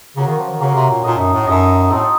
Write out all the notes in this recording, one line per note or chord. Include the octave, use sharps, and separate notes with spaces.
C#3 A#3 C#4 F#4 A#4
D#3
F3
D#3
C#3 A#3 C#4 F#4 A#4
C3
A#2
A#2 D#4 A4 D#5
F#2
A2
F#2 D#4 A4 D#5
A2 C4 D#4 A4